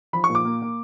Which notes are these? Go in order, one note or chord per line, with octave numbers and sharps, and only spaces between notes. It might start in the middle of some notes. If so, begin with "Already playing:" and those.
F3 B5
C#6
A#2
D6
A#3
A#3